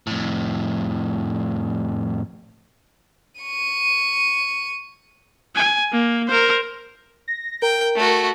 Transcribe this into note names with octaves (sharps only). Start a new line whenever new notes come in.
F2 A2
C#6 D#7
G#5
A#3
A#4 C5
A#6
A#4 G5
A3 F#4